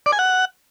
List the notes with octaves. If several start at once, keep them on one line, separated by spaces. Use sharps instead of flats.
D5
G#5
F#5